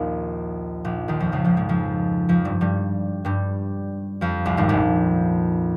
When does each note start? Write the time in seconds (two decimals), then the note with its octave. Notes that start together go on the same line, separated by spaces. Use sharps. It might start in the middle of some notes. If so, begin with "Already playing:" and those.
Already playing: A#1 D#2 A#2 D#3
0.85 A#1 A#2
1.08 D#2 D#3
1.20 F2 F3
1.32 C#2 C#3
1.44 F2 F3
1.57 G#2 G#3
1.69 F2 F3
2.29 F2 F3
2.45 G2 G3
2.61 G2 G3
3.25 G2 G3
4.21 F2 F3
4.46 C2 C3
4.57 G#1 G#2
4.69 A#1 A#2